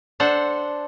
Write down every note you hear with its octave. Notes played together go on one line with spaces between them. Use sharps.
D4 A4 C5 F#5